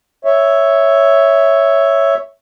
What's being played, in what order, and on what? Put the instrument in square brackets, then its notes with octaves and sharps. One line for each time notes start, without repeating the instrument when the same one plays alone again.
[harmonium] C#5 E5